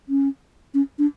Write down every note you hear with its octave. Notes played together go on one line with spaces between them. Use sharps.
C#4
C#4
D4